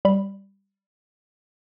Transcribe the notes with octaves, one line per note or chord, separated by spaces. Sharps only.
G3 B5